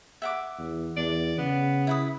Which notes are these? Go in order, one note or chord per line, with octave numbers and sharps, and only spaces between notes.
E5 F#5 D6
E2
E2 D5
C#3 B3
E4 B4 D#6